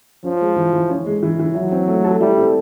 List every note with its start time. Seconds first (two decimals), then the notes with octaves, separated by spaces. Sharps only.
0.24 F3 C#4
0.41 G#3
0.56 E3
0.73 E3
0.90 C#4
1.06 G#3
1.23 E3
1.39 E3
1.55 F#3 E4
1.72 C4
1.88 A3
2.04 A4
2.20 G3 E4
2.37 C4